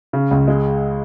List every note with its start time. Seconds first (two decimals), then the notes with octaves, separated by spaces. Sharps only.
0.13 C#3
0.31 C#2
0.48 G#3